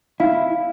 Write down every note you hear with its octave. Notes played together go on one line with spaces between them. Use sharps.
E4 F5